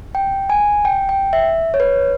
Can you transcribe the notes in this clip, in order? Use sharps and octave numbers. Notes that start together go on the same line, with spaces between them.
G5
G#5
G5
G5
E5
C#5
B4